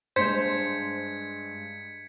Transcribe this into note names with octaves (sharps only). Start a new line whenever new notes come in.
G2 G#3 C5 G#6 B6 C#7